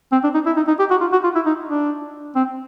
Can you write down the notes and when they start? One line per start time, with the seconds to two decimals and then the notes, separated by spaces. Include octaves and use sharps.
0.12 C4
0.24 D4
0.34 D#4
0.46 E4
0.57 D#4
0.68 D#4
0.79 G4
0.91 F#4
1.01 F4
1.12 F#4
1.24 F4
1.35 E4
1.46 D#4
1.69 D4
2.36 C4